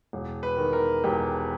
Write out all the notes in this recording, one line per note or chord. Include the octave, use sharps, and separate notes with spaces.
E1
B4
D#3
A#4
E1 G4